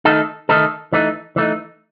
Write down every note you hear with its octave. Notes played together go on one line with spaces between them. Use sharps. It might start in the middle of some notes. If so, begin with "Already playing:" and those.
D#3 A3 D#4 A4
D#3 A3 D#4 A4
E3 A3 D#4
E3 A3 D#4